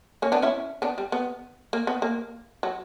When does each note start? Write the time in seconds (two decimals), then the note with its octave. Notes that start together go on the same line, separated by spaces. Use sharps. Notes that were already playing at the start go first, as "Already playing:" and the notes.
0.22 A#3 C#4
0.32 B3 D4
0.42 C#4 E4
0.82 B3 D4
0.98 G3
1.12 B3
1.73 A#3
1.87 B3
2.02 A#3
2.63 F#3